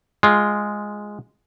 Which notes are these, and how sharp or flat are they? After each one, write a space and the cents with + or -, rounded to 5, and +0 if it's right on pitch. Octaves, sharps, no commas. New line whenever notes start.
G#3 +0 F4 +0